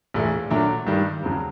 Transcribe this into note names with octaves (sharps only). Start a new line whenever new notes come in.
A#1 A2 E3
A#2 F#3 A3 D4
G2 D#3 G3
F2 C#3 F#3